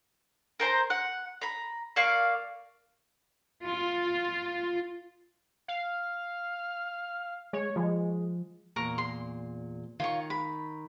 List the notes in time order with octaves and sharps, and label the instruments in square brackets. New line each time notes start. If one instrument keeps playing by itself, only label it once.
[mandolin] A#4 C5 A5 A#5
F#5
A#5 B5
A#3 D5 F5 C#6
[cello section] F4
[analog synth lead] F5
[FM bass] G#3 [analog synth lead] C#5
[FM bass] F3 [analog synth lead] G#3
[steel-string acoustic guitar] E2 A#2 [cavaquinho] A#4 A#5 C#6
[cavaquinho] C6
[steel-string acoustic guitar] D#3 [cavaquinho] F4 C#5 C#6
[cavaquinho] B5